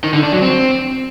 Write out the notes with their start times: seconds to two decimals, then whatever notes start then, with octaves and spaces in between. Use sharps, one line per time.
0.04 D#3
0.13 D3
0.23 D4
0.33 F#3
0.42 C4